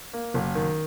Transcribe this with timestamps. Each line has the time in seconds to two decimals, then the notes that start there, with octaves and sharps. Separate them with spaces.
0.13 A#3
0.34 F#1
0.55 D#3